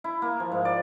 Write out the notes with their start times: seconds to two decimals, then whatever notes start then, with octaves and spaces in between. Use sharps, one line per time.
0.04 E4
0.22 A#3
0.40 F3
0.52 G#2
0.65 D5